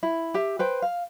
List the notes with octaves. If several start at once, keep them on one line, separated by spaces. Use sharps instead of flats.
E4
G4 E5
B4 C5 G5
F5